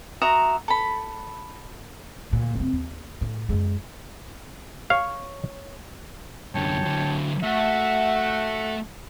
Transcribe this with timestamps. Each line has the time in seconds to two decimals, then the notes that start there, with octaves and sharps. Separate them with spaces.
0.22 F#4 E5 A#5 D#6
0.68 A4 B5
2.31 D2 A#2
2.56 G1 C4
2.73 D#2
3.21 A2
3.49 F#2 G#3
4.90 C#5 F5
6.55 F#2 D3 C#5 G5 A5
6.85 D3 F#3
7.43 A3 F#4 E5 F#5